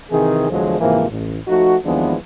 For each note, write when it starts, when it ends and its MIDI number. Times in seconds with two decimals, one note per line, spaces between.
0.10 0.46 48
0.10 0.46 51
0.10 0.46 52
0.10 0.46 60
0.10 0.46 68
0.50 0.76 40
0.50 0.76 50
0.50 0.76 53
0.50 0.76 54
0.50 0.76 56
0.50 0.76 72
0.80 1.06 44
0.80 1.06 48
0.80 1.06 52
0.80 1.06 53
0.80 1.06 58
1.10 1.38 33
1.48 1.76 53
1.48 1.76 57
1.48 1.76 63
1.48 1.76 66
1.85 2.15 39
1.85 2.15 52
1.85 2.15 53
1.85 2.15 56
1.85 2.15 59
1.85 2.15 62